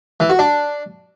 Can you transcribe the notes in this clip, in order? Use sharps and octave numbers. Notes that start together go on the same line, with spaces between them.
E3
F#4
D4